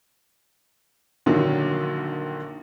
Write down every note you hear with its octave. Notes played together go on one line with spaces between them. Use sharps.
A#1 A#2 D3 D#3 F#3